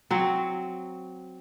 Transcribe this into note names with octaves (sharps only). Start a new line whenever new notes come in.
F#3 C4